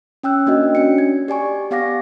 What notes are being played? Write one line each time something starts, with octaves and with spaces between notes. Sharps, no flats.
C#4 G5 E6 F#6
A#3 D4 F#4 D#5
C#4 D4 C#7
G#6
G4 D5 G#5 C#6
B3 G4 F5 F#5 D6 A#6